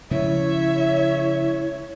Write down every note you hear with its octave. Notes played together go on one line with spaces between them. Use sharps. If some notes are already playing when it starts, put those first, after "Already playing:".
C#3 F3 G#3 E4 C#5 E5